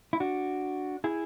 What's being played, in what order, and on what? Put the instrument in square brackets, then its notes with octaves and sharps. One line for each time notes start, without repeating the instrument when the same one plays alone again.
[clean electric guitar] E4
D4 F#4
E4 G#4